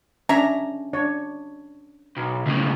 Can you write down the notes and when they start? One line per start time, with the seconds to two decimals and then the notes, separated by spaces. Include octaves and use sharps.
0.29 C#4 D4 E5 A#5
0.93 D4 C#5
2.17 B1
2.46 C#2 A2